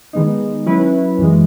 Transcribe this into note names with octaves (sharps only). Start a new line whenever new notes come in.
D#3 G#3 B3 D#4
F#3 C#4 E4 B4
F#2 E3 G#3